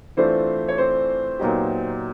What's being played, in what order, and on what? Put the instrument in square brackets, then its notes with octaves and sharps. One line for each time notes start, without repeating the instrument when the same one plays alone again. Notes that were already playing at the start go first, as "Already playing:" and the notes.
[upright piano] E3 A3 D4 F4 [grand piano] C4 C5
[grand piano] C#5
C4 C5
[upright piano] A#2 F#3 B3 D#4 G4